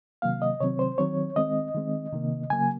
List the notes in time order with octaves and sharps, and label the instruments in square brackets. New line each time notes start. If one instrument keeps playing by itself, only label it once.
[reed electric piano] C3 D#3 F#3 A#3 F5
D#5
C3 D#3 F#3 C4 C#5
C5
D#3 F#3 C4 C#5
D#3 G#3 C4 D#5
D#3 G#3 C4
C3 D#3 A#3
C#3 F#3 A#3 G#5